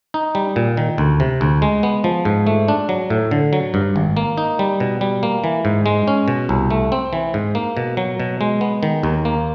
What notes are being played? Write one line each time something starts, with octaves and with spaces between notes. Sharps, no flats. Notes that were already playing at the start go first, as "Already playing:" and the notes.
D#4
G3
A#2
D#3
D2
C3
D2
G#3
B3
F3
G#2
A3
D4
F#3
A2
D3
F#3
G2
G#1
A#3
D#4
G3
B2
G3
A#3
E3
G#2
G#3
C#4
B2
C2
A3
C4
E3
G#2
A#3
B2
F#3
B2
G#3
B3
D#3
D#2
A#3